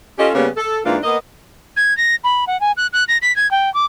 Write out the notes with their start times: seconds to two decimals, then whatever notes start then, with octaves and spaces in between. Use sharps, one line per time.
0.19 C#4 F4 G4 A4 D#5
0.35 C#3 G3 A#3 B3 C#4
0.57 A4
0.86 G#2 E3 A#3 D4 F4
1.04 A#3 B3 D#5
1.77 G#6
1.97 A#6
2.24 B5
2.47 F#5
2.61 G#5
2.77 F#6
2.93 F#6
3.08 A#6
3.22 B6
3.36 G#6
3.51 G5
3.74 D6